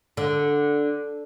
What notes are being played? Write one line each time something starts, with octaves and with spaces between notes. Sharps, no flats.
D3